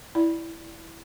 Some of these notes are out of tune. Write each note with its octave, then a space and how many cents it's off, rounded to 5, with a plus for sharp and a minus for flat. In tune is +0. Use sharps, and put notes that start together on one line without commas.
E4 +0 D5 +0